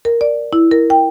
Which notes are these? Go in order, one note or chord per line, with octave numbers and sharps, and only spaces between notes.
A#4
D5
E4
A#4
G5